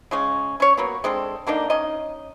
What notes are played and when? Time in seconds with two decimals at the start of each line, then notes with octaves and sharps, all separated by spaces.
0.11 C#3 G#3 C#4
0.60 C#4 C#5
0.77 F#3 A#3 B3
1.04 G#3 C4 D4 A4
1.47 D3 A#3 D4 D#4
1.70 C#4 D#4 D#5